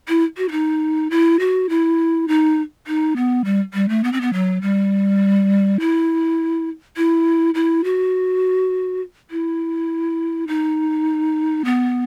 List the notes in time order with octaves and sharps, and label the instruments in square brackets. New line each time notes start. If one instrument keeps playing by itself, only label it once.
[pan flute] E4
F#4
E4
D#4
E4
F#4
E4
D#4
D#4
B3
G3
G3
A3
B3
C4
B3
F#3
G3
E4
E4
E4
F#4
E4
D#4
B3